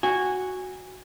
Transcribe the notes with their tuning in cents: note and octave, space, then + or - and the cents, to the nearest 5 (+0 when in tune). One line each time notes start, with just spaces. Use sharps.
F#4 +0 G#5 -15